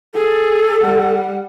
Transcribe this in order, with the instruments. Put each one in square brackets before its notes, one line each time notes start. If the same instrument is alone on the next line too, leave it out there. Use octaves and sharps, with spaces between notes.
[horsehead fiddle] G#4 [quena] A4
[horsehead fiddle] G3 F#5